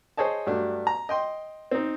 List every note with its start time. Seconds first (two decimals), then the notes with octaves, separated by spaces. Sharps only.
0.17 G#4 C5 C#5 D#5 A5
0.47 G2 F#3 A3 D4
0.87 A#5
1.09 D#5 G5 C6
1.71 C4 D#4